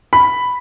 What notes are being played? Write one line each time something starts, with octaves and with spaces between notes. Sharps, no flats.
B5